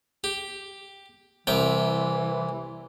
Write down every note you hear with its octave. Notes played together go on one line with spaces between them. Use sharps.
G4
C2 C3 E3 G5